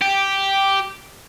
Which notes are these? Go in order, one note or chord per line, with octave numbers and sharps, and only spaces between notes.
G4